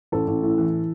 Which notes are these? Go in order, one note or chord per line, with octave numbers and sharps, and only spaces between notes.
A1 A4
A1
A2
E3